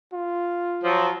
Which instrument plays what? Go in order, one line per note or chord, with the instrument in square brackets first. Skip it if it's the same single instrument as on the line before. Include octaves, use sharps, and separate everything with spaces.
[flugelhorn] F4
[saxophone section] F3 F#3